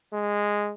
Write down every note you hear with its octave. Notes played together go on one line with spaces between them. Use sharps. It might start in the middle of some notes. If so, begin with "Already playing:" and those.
G#3